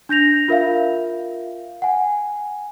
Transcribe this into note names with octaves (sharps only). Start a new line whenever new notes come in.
D4 G6 A#6 F7
F4 A#4 E5 F5
F#5 G#5